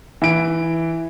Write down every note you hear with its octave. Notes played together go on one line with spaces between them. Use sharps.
E3 D7